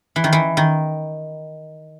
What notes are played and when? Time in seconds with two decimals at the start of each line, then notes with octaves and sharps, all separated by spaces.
0.16 E3
0.24 D#3
0.33 E3
0.57 D#3